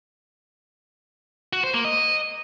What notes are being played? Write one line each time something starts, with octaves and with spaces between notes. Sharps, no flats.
F#4
C5
A#3
D#5